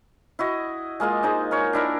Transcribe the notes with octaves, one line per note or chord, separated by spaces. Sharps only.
E4 F#4 D#5
G#3 A#3 F4 D#5
G#3 D#4 C5
A#4 C#5
D4 E4 A#4